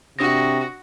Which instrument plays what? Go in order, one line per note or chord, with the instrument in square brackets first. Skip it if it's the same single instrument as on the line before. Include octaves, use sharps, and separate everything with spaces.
[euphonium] C3 [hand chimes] D4 D#6 A#6 [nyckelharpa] F#4